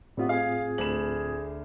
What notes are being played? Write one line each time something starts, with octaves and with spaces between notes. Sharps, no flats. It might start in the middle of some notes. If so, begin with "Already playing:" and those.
A2 G3 A3 B3 C4 F4
G#4 F5
D2 B5 F6 E7 F#7